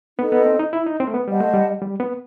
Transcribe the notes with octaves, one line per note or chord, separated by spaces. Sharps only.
B3 D#4 A4 D#5
B3
C4
D#4
E4
D#4
C4
A3
B3
G3 C5 D#5 F#5 A5
A3
G3
G3
B3